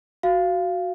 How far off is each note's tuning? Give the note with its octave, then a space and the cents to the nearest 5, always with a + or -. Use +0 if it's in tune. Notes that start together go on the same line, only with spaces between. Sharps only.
F#4 +0 F5 -15